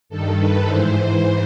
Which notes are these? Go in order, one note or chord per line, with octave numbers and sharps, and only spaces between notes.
G2 D#3 A4
B4
G#2 E3 C5
C5